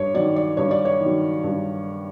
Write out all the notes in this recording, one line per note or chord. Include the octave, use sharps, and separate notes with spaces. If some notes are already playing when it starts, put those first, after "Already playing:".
Already playing: G2 C#5
D#3 F#3 D5
D5
G2 C#5
D5
C#5
D#3
F#3
G2